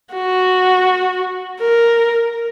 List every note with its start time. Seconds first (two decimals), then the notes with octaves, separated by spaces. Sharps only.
0.14 F#4
1.60 A#4